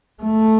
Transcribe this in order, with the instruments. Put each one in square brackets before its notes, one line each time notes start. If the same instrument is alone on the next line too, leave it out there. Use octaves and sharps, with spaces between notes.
[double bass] A3